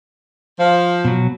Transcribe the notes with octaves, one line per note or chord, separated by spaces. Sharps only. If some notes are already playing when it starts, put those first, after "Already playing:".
F3
B2 F#3